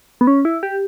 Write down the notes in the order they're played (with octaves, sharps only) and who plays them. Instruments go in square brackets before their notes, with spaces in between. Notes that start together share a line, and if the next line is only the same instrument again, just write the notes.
[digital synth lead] B3
C#4
E4
G4